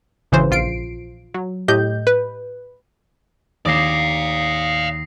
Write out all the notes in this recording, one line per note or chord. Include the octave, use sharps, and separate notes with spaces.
G#1 C#3 E3 C5
A#1 F4 C7 D7
F#3
A2 G4 D#5 G6
B4
D#2 A#3 D5 F5 D6 D#6 A#6 C7